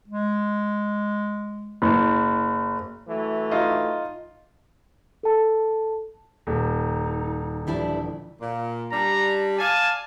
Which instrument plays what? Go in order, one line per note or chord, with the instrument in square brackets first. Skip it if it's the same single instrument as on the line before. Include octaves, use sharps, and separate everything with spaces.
[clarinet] G#3
[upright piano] F#1
[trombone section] E3 F#3 A3
[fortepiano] D#4 F4 D#5
[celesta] A4 A5
[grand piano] D#1 [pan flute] D#4
[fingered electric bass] D3 E3 F3 [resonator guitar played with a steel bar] G3 D4 E4
[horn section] A#2
[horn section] G3 D4 [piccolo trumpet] A#5
[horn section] D5 F5 G#5 [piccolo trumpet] A5